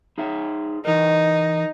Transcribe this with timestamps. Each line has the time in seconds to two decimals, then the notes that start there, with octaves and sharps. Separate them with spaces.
0.18 D#4 G#4 E5
0.85 E3 D#4 A#4